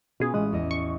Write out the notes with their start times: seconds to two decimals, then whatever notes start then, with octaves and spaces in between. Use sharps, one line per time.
0.20 B2 C#4 F4 G#4 B4
0.34 A1 G#3 D#6 F#6
0.53 E2 D#5
0.71 C#6